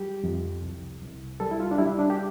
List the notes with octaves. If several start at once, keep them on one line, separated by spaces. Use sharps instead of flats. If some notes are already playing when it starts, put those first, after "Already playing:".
Already playing: G3 G4
F2
C2
C2
G3 A4
E4
F4
D4
G3 E4
D4
G4